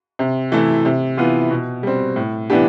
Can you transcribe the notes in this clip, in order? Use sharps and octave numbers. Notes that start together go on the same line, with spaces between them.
C3
E3 A3 E4
C3
E3 B3 F4
B2
G3 C4
A2
E3 B3 D4 G4